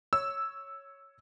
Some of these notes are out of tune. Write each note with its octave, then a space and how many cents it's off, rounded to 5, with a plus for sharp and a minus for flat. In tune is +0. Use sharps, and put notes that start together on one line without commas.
C#5 +0 E6 +0